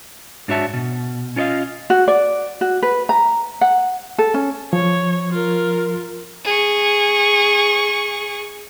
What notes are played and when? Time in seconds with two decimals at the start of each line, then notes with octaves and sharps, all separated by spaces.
0.48 G#2 D4 F#4 C#5 E5 A5
0.74 B2
1.36 C#4 F4 C#5 D#5 F5
1.90 F#4
2.08 D5
2.61 F#4
2.83 B4
3.09 A#5
3.61 F#5
4.18 A4
4.34 C#4
4.73 F3 C#5
5.30 F4 A#4
6.44 G#4 C#6